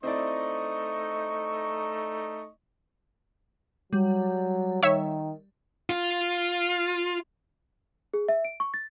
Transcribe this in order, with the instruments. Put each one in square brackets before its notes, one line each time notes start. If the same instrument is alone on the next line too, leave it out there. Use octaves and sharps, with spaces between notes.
[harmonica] A3 D#4 C#6 [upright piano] C4 E4 D5 [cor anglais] D#5
[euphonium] F#3 [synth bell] G3
[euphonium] D#3 [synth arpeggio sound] C#5 E5
[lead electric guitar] F4
[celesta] G#4
E5
D7
C#6
A6